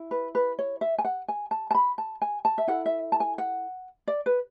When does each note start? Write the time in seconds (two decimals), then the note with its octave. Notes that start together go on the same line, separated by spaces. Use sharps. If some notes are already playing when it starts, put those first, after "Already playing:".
Already playing: E4
0.11 B4
0.35 B4
0.59 C#5
0.81 E5
0.98 G#5
1.05 F#5
1.28 G#5
1.51 A5
1.71 A5
1.75 B5
1.98 A5
2.22 G#5
2.45 A5
2.58 E5
2.68 E4 A4 F#5
2.86 E5
3.12 A5
3.20 G#5
3.38 F#5
4.08 D5
4.26 B4